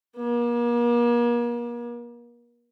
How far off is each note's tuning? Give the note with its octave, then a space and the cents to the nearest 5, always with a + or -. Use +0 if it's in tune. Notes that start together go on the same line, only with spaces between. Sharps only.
A#3 +40